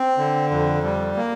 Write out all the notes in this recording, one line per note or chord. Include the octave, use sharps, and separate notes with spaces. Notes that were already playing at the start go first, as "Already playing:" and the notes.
Already playing: C4
D3
F2
G3
A#3